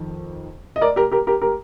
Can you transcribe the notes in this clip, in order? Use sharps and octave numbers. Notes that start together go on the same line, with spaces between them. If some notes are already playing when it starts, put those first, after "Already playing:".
Already playing: F2 D#3
D#5
A#4 D5
G4 A#4
G4 A#4
G4 A#4
G4 A#4